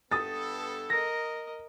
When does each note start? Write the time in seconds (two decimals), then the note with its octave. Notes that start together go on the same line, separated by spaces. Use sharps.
0.12 G2 B3 A4 D#6 A6
0.90 A#4 D#5 A#6